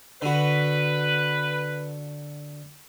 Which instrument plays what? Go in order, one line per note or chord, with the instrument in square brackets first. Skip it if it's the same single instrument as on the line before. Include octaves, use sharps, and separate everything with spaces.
[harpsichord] D3 F#4 [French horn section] B4